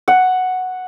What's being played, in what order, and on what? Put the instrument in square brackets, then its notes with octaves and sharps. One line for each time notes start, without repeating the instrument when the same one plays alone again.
[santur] F#5